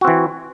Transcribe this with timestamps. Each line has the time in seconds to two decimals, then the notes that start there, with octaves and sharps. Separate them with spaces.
0.01 F#4
0.04 C4
0.08 E3